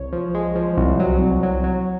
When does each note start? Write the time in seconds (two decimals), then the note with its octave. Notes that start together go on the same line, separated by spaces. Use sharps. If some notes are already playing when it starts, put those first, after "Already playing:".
Already playing: C2 C#5
0.13 F3
0.34 G#3
0.55 F3
0.77 C2
1.00 F#3
1.21 C2
1.43 F#3
1.64 F#3